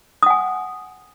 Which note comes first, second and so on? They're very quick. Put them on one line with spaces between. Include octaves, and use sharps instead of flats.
D#6 F#5 G#5